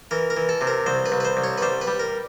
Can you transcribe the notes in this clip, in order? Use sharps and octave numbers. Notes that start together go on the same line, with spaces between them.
E3 A#4
A#4
E3
A4
C3
A#4
C2 C5
B4
C2
B4
C5
C2
C#5
B4
G3 C5
B4
G3
A#4